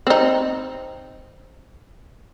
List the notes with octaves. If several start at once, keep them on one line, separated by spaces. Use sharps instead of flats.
C4 D#4